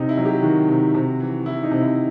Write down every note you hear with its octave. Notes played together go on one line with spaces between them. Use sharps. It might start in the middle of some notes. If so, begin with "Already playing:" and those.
Already playing: C3 D#4
E4
F#3
G4
D#3 F#4
C3
C3
E3
E3 E4
D#4
C3
E4